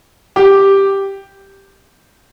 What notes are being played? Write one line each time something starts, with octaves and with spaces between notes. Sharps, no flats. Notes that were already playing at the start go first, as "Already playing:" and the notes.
G4